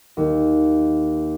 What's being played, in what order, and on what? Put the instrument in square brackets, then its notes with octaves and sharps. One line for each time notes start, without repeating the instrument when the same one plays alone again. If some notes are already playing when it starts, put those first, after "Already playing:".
[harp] D#2